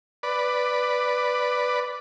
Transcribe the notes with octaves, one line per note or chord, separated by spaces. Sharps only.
B4 D5